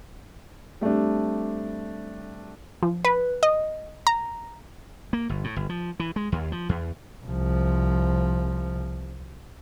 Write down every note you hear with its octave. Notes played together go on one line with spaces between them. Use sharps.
G3 A3 C4 D4
F3
B4
D#5
A#5
A#3
G1
A2
G1
F3
E3
G#3
D#2
F3
E2
C2 F3